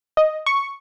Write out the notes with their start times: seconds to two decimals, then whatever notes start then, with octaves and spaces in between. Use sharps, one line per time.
0.17 D#5
0.46 C#6